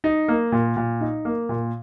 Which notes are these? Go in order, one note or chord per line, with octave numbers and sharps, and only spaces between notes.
D#4
A#3
A#2
A#2
D#4
A#3
A#2